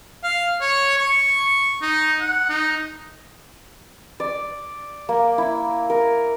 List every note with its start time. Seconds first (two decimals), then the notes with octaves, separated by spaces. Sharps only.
0.23 F5
0.61 C#5
0.98 C#6
1.82 D#4
2.20 F#5
2.49 D#4
4.20 D5
5.09 A#3
5.38 E4
5.90 A#4